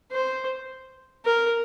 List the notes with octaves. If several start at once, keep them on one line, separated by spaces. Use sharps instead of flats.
C5
A#4